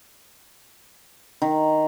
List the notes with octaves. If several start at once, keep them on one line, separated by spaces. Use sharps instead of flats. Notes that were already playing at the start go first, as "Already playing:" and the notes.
D#3